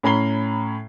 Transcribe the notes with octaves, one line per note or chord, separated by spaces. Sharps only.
A2 C#4 A#5 B5 C7 G7